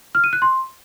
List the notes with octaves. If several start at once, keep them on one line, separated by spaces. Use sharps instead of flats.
F6
D#7
F#6
C6